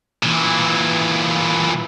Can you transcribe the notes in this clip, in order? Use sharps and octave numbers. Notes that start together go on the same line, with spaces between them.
A#2 E3